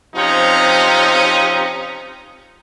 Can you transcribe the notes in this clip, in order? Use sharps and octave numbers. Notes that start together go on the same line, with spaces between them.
C3 F3 C4 C#4 D#4